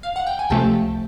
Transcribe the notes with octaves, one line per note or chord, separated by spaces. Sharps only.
F5
F#5
G5
G#5
C#2 C3 F3 A3 G5 A5